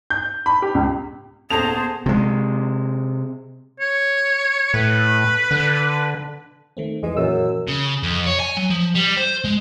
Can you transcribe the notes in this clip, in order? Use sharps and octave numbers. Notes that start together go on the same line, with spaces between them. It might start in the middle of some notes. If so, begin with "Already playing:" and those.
G6
B5
G4
C#2
D#1 B3 G#4 A4 C5 A5 A#6 F7
C3 G#3
C#5
A2 B4
D3
D#3 A3 C4
F2 E3 G#3
F#2 A#2 E3 E6
C#3
F2
C#5
G#5
F#3
F3
G3
C5
G#3